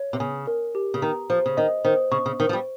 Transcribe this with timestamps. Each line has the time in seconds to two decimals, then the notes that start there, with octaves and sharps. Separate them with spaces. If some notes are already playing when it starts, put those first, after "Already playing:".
Already playing: C#5
0.13 C3
0.20 C#3 G#5
0.47 A#4
0.75 G4
0.94 C#3
1.02 D#3 A#5
1.30 F3 C5
1.46 C#3
1.57 D#3 D#5
1.85 D#3 C5
2.12 C#3 C#6
2.26 C#3
2.40 D#3 C5
2.49 F3
2.53 G3